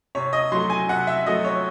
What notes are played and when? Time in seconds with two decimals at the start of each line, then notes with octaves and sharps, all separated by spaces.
0.15 C3 C#5
0.33 D#5
0.52 F#3 A3 C6
0.70 G#5
0.89 C3 F#5
1.07 E5
1.26 F#3 A3 D#5
1.45 C#5